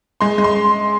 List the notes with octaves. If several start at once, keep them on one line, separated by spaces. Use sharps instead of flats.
G#3 C6
G#3
C6